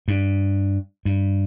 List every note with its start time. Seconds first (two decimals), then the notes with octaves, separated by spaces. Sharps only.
0.08 G2
1.05 G2